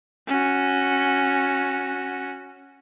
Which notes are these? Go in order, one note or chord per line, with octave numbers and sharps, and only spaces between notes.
C#4 F#4